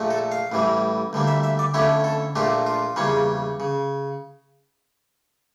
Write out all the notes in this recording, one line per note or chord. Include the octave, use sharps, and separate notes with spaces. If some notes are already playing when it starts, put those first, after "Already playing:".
Already playing: A#1 A#2 A3
A4
F5
A1 A2 E3 G3
D2 D3 G3 A#3
E5
E5
D5
F2 D3 A3 C#4 E4 G4
A4
A#1 A#2 A3 D4 F4 G4
F4
E2 C#3 G3 A#3 C#4
C#3